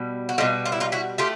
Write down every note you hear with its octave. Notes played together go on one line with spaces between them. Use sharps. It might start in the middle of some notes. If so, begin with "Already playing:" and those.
Already playing: B2 G3
F#4
B2 G3 D#4 F4
F4
E4
D#4 F4
E4 F#4
A3 F4 G4